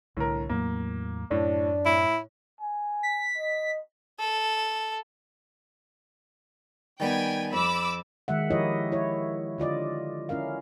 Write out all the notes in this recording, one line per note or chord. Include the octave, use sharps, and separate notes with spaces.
C2 A2 D3 A#4
E2 A2 F#3 A#3
F#2 A2 D4
A2 E4
G#5
B6
D#5
A4
D#3 G3 B3 G5 G#5
F2 B5 D6 E6
D#3 G#3 E5 F#5
F3 E4 G4 A#4 C#5 D#5
E4 C#5
D3 F4 D5 D#5
C#4 E4 A#4 F5